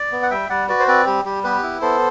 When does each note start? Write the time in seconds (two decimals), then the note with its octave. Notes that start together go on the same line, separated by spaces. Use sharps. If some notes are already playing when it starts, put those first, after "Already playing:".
Already playing: D5
0.12 B3
0.22 F#5
0.31 G3 E5 G5
0.49 G3 D5 F#5
0.68 F#4 B4 D5
0.80 C5
0.87 C4 B4 D5
1.06 G3 G4
1.25 G3 G4
1.44 B3 G4 B4
1.63 E4
1.82 B3 A4 C5